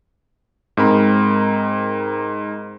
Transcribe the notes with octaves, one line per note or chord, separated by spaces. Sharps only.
G#2 C4 A#4 B5